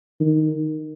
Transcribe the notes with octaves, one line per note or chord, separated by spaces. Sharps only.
D#3